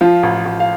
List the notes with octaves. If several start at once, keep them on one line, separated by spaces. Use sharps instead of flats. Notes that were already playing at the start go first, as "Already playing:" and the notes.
F3 F4
A1
A1
F5